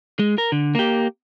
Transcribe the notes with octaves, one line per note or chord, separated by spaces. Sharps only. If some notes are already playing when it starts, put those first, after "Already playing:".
G#3
A#4
D3
A#3 G4